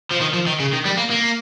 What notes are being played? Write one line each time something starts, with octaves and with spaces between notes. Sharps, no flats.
F3
D#3
F3
D#3
C#3
D#3
G3
A#3
A#3